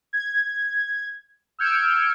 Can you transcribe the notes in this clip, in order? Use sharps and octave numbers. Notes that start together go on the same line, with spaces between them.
G#6
E6 F6 G6 G#6 C#7 D7